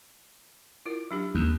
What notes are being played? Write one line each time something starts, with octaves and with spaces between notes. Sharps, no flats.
E4 F4 A#4
F#3 D4 G4
D#2